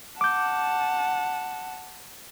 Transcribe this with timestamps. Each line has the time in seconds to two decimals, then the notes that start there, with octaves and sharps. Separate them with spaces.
0.21 F#5 A5 D6 G6